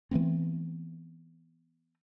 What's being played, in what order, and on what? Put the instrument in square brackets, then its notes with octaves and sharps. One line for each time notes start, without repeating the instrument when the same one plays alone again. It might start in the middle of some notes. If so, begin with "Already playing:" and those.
[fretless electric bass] E3 A3 B3 C4